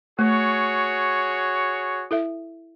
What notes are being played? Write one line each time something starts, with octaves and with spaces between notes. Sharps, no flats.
A3 F#4 G#4 C#5
E4 A4 E5